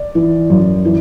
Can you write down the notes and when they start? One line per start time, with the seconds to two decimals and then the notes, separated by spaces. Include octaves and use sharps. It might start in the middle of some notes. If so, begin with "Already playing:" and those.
Already playing: D5
0.15 E3
0.50 F#2
0.85 E3